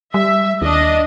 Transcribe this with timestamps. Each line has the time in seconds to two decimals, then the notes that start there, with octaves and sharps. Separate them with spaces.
0.14 G3 E5
0.62 D#2 D4 D#5